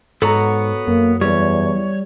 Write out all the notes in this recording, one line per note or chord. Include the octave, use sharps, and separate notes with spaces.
G#2 B3 F#4 A4 C#5 A#5
F#2 A#3
E2 G3 C#5